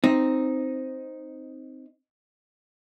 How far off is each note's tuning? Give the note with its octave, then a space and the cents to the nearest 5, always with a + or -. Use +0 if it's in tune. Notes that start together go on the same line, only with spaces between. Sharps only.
C4 +0 D#4 +0